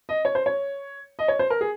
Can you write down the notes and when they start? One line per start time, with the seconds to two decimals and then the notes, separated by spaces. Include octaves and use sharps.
0.09 D#5
0.25 C#5
0.35 C5
0.46 C#5
1.19 D#5
1.28 C#5
1.39 C5
1.50 A#4
1.61 G#4